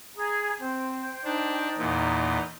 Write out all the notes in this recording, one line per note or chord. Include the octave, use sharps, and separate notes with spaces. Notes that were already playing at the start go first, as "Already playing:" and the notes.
G#4 A#5
C4 C5 G5
D4 D#4
E2 A#2